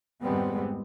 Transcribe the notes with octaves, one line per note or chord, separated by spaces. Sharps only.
G#1 F2 G3 G#3 B3 C4